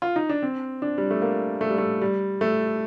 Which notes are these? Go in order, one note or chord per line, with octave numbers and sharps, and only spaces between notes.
F4
D#4
D4
C4
D4
G3
A3
A#3
A3
G3
A3
G3
A3